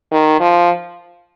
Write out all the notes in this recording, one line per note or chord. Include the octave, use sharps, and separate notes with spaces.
D#3
F3